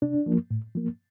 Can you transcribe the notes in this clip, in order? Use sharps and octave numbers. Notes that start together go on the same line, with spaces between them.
C3 D4
F3 A#3
A2
F3 A#3